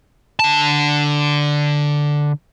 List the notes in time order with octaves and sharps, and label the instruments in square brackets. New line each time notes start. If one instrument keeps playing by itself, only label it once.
[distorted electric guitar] D3 A5